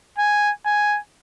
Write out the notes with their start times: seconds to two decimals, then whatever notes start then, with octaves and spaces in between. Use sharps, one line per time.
0.18 G#5
0.66 G#5